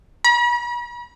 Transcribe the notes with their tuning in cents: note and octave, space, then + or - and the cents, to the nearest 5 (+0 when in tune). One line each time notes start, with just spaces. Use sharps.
B5 -45